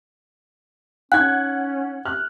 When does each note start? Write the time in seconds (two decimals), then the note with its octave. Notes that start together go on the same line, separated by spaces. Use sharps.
1.12 C#4 D#4 F#5 F#6 G#6
2.05 F6 F#6